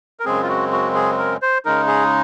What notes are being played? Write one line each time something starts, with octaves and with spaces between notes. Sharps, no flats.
A#4
F#2 C#3 G#3 C4 G#4
F4
F#4
F#4
G#4
A#4
C5
C#3 G#3 D#4 A#4
G#4